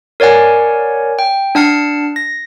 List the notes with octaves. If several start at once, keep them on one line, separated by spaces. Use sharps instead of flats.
A#4 C#5 D5 F#5 G#5
G5
D4 F#5 A5 F6 C7 C#7
A#6